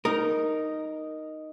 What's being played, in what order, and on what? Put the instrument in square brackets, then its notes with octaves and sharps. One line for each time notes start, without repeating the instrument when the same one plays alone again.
[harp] D#4 [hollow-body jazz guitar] A#4